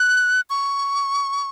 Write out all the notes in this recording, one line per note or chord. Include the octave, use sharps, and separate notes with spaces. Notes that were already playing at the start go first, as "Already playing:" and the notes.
Already playing: F#6
C#6